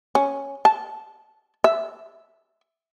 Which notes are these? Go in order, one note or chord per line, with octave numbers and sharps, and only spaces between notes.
C#4
A5
E5